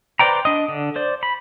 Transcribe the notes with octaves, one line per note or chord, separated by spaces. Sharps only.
B4 C5 D5 G5 A#5
D4 D#5
D3
C5 D5
B5